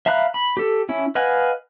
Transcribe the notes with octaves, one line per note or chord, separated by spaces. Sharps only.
E5 F5 A#5 B5 F#6
B5
G4 A4
C#4 E4
B4 D#5 F5 F#5 G#5